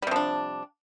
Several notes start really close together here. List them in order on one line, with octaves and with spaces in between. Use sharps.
G3 C3 F3 D4